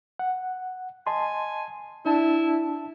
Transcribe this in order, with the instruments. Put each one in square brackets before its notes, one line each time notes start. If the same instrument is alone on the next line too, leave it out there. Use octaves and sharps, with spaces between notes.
[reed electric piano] F#5
[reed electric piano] D#5 A5 C6 [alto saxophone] G#5
[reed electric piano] D4 A5 [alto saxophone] E4